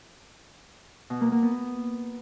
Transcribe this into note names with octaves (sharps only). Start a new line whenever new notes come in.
B2
A#3
A#3
B3